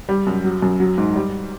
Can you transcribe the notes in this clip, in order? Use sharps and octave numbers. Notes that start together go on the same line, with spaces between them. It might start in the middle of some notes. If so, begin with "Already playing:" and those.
G3
F#2
F#3
F#2
F#3
G#2
G3